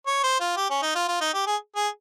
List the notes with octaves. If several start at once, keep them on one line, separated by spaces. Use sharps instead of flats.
C#5
C5
F4
G4
C#4
D#4
F4
F4
D#4
G4
G#4
G#4